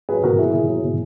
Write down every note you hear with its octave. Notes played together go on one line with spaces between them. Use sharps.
F#3 G#4 B4
B2 F#4 A#4
F#3 E4 G#4
B2 E4 G#4
F#3
B2